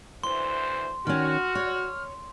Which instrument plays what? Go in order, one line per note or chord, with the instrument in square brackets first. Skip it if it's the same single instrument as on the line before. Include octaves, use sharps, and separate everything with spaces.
[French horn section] D2 E3 C5 [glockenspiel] C6
[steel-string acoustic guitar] D#3 C#4 [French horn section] F#4 [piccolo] F6
[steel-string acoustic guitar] C#5